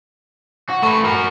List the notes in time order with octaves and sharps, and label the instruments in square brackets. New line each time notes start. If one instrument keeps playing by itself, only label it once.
[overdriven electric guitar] F#4
[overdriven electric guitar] A3 B4 [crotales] C#6
[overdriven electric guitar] F#4 A#4